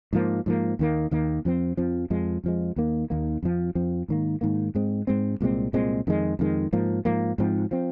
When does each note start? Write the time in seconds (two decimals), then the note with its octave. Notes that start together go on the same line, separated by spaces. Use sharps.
0.13 G#2 F3 A#3
0.46 G#2 F3 A#3
0.79 D#2 D#3 A#3
1.11 D#2 D#3 A#3
1.45 F2 F3 C4
1.77 F2 F3 C4
2.10 F2 F3 G#3
2.44 F2 F3 G#3
2.76 D#2 D#3 A#3
3.10 D#2 D#3 A#3
3.43 F2 F3 C4
3.75 F2 F3 C4
4.08 G#2 D#3 A#3
4.41 G#2 D#3 A#3
4.75 G#2 G#3 C4
5.07 G#2 G#3 C4
5.41 C2 A#2 G#3 C4
5.73 C2 A#2 G#3 C4
6.07 F2 D#3 G#3
6.39 F2 D#3 G#3
6.73 G#2 F3 A#3
7.05 G#2 F3 A#3
7.38 G#2 F3 C4
7.71 F3 C4